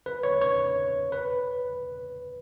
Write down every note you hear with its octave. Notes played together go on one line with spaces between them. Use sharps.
B4
C#5
C#5
B4